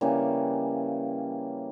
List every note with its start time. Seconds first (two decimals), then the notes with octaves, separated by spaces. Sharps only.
0.01 C#3 E3 G3 A#3